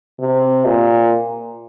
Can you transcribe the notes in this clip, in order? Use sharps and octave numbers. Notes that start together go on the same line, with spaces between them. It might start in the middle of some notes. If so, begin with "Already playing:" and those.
C3
A#2